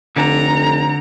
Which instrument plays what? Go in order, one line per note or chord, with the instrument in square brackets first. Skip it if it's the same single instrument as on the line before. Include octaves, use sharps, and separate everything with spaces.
[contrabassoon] F1 [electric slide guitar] D3 [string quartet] A#5